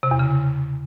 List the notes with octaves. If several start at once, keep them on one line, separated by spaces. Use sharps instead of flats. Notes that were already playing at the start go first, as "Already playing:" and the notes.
C3
E2
C#3